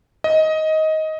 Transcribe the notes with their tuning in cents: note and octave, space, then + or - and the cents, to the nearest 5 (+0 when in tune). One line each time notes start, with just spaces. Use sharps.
D#5 +15